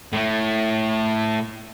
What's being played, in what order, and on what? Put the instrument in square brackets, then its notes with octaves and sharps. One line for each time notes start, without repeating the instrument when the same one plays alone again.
[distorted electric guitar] A2 A3